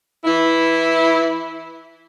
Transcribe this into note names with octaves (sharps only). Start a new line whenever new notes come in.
E3 E4